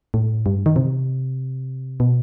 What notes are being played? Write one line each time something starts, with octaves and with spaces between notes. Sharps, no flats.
A2
G2
D#3
C3
B2